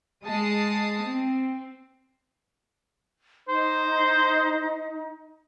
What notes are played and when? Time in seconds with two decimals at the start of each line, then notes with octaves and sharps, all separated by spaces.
0.24 G#3 A5 D#6 C7
1.06 C4
3.48 D#4 C5